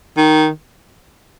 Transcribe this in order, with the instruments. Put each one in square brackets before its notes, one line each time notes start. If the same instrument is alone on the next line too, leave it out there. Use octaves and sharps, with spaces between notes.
[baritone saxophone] D#3